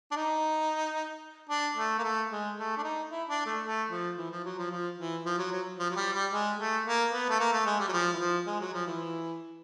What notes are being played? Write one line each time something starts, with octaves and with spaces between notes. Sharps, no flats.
D4
D#4
D4
A3
A#3
A3
G#3
A3
D4
D#4
E4
D4
A3
A3
F3
E3
F3
F#3
F3
F3
E3
F3
F#3
F#3
F3
F#3
G3
G3
G#3
A3
A#3
B3
A3
A#3
A3
G#3
G3
F#3
F3
E3
F3
G#3
F#3
F3
E3